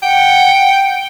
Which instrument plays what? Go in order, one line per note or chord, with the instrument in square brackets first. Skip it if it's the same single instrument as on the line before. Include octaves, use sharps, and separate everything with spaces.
[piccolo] F#5 [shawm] G5